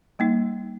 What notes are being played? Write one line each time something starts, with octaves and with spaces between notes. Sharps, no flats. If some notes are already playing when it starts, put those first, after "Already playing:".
G3 A#3 D#4